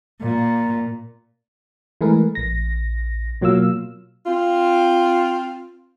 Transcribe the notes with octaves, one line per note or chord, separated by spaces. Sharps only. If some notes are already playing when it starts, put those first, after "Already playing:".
A#2
E3 G#3 A3 G#4 A#4 B4
A#1 A#6
B2 F#3 A#3 F4 F5 E6
C4 F4